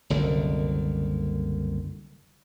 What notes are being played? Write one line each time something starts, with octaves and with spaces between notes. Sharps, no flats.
F#1 C2 D3 D#3